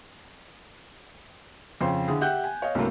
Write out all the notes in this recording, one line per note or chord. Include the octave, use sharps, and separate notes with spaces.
F2 C#3 C5 G5 C6
D3 E4 G#4
G4 E5 F#5 G5 F#6 G6
G#5
C#5 D#5 F5
C2 G2 F#3 A3 A#3